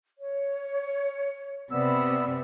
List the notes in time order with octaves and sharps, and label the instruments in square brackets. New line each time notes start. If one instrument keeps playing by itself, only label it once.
[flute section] C#5
[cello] C3 [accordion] B3 E6 [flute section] D5 B5